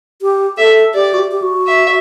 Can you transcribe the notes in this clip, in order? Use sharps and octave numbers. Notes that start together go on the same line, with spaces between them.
G4
A4 E5
G4 D5
F#4
G4
G4
F#4
E5